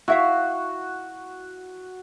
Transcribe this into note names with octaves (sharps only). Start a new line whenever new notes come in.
E4 F#4 E5 F5